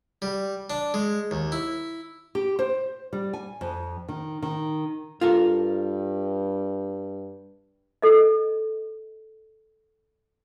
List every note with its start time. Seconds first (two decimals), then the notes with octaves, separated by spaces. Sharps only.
0.22 G3
0.70 D4
0.94 G#3
1.31 D#2
1.52 E4
2.35 G4
2.59 C5
3.13 G3
3.33 G#5
3.61 F2
4.08 D#3
4.42 D#3
5.21 G2 F4 A4 A#4
8.02 A4 D#5